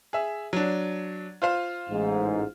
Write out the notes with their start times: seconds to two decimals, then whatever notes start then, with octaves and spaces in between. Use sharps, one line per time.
0.13 G#4 E5
0.53 F#3 D4
1.42 F4 C5 F5
1.90 A1 G#2